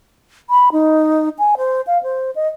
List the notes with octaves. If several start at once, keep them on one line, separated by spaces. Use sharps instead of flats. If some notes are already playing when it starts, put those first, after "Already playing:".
B5
D#4
G#5
C5
F5
C5
D#5